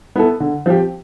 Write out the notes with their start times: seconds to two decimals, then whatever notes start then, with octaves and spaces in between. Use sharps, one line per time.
0.16 B3 E4 A4
0.40 D3
0.66 F3 C4 G4